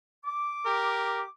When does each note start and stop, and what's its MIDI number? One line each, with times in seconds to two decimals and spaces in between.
0.25 1.30 86
0.65 1.23 67
0.65 1.23 70